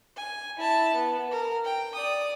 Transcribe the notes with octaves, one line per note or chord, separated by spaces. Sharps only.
G#5
E4 A5
B3
A#4
G5
D5 D#6